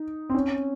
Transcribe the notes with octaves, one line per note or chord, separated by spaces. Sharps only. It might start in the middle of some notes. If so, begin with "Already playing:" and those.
Already playing: D#4
C4
C#4